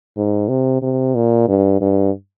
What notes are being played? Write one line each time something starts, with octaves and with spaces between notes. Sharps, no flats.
G#2
C3
C3
A#2
G2
G2